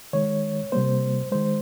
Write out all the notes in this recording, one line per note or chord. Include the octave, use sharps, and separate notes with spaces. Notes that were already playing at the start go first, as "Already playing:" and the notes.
D#3 G#3 C#5
C3 G3 A#3 C5
D#3 G#3 C5